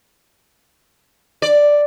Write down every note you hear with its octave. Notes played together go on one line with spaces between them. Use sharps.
D5